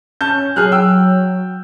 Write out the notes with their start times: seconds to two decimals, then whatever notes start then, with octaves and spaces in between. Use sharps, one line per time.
0.21 C#4 A5 G6
0.56 F#3 G#4 F6 F#6
0.72 G5 E6